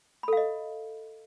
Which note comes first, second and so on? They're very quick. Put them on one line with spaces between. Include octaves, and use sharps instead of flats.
B5 A4 F5 D#5